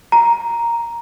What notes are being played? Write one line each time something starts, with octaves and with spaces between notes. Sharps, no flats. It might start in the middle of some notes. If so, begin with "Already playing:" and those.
A#5